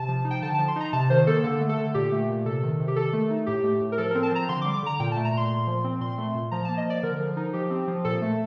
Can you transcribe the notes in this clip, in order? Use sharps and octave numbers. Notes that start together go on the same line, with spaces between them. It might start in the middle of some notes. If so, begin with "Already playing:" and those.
Already playing: C3 A5
F3
D#4
G5
D3 A5
A5
F3
C6
D#4 A#5
C3 A5
D#3 C5
A#3 A4
D3 A4
A3
A4
D3
A#2 G4
A3
A#2
C3 A4
D#3
C3
G4
D#3 A4
A3
D#4
A2 G4
A3
A2
A#4
F3 A4
A#4
C4
A5
F3 A#5
D3 C6
D6
G3
D6
D3 A#5
A#2 G5
A5
A3
A#5
A#2 C6
A#2
F3
C4
A#2 C6
A3
A#2
F3 A#5
A5
A#3
D#5
F3 D5
D3 A#4
F3
D#4
F3 G4
C4
F3
A#2 A4
A3